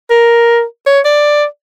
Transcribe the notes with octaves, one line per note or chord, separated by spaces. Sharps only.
A#4
C#5
D5